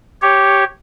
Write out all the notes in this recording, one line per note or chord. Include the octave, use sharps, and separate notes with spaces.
G4 C#5